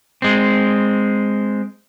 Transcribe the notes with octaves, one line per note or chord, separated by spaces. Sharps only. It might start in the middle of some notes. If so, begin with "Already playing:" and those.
G#3 C4